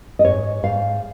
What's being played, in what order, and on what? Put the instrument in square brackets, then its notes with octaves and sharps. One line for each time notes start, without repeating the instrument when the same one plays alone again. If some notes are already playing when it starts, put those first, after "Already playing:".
[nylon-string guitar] D#5
G#2 C#5
G#2 F5